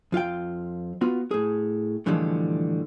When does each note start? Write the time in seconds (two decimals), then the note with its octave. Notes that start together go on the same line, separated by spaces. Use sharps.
0.12 F2 F4 F5 G5
1.01 B3 F4 F#4
1.31 A2 G#4
2.06 A2 D3 E3 F3 G3 G#3